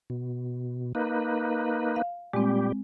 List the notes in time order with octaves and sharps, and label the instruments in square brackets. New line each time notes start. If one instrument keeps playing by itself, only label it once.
[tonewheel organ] B2
A#3 D#4 B4
[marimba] F5
[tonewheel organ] A#2 G3 G4 [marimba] G#3 C4